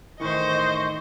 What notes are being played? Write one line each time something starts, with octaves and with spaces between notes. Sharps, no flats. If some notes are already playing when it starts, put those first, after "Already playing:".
A2 D#3 E3 C5 D#5 C#6